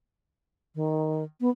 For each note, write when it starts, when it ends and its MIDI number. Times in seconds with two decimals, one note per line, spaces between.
0.75 1.24 51
1.41 1.50 59